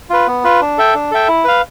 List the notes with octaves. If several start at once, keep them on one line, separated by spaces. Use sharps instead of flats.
F4 B4
B3
F4 B4
D4
A4 E5 G5
D4
A4 E5 G5
E4
B4 F5